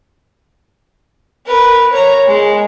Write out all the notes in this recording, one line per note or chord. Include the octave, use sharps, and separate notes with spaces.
A#4 B4
C#5 A#5
G#3